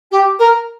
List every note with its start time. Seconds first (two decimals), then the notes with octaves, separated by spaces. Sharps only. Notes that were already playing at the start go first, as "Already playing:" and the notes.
0.11 G4
0.39 A#4